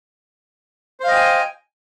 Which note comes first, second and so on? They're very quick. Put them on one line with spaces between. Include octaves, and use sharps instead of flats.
C5 F5 D#5 G5 G#5